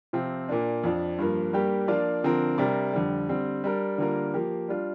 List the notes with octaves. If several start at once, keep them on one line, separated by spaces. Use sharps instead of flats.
C3 F3 C4 F4
A#2 A#3 D4
F2 F3 D4
G2 F3 A#3
G2 G3 A#3 G4
F3 A#3 D4 F4 D5
D3 F3 C4 A#4
C3 G3 D4 A#4 D5
F2 D3 G3
D3 G3 C4
G3 D4 A#4
D3 G3 A#3 F4 A#4
F3 A#3 G4
G3 D4 F4